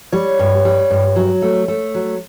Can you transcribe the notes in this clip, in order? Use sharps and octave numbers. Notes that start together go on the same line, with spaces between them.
G3 C#5
G2
G3
G2
F#3
A3
A3
F#3